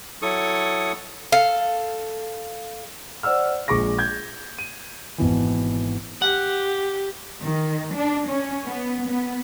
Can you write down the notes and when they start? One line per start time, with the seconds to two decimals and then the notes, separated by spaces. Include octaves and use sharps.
0.22 F#3 E4 A4 C#6 D#6
1.32 A4 F5
3.23 C5 D5 F#5 E6 F6
3.68 A#1 G#3 C#6 D6 A#6
3.99 G6 G#6
4.59 D#7
5.18 G#1 B2 E3
6.22 G4 F#5
7.40 D#3
7.94 D4
8.28 C#4
8.67 B3
9.09 B3